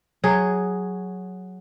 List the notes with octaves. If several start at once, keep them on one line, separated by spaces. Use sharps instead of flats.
F#3 G#4